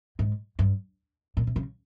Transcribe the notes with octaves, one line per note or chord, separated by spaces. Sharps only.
G#2
G2
A#2
C3
C#3